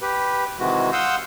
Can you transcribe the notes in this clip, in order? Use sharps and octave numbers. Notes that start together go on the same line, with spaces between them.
G4 B4
C3 D#3 E3 G#3 F#4
F5 F#5 C6 D#6 E6 G6